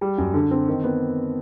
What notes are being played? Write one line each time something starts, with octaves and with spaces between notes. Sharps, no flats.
G3
F#2
D3
C4
D#3
B3